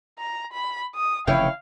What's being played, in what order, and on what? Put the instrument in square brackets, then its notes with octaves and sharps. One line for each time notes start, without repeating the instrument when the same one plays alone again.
[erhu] A#5
B5
D#6
[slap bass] F1 C#3 E3 [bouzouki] E4 C#5 G5 [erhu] F5